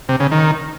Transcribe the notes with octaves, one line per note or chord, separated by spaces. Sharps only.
C3
C#3
D#3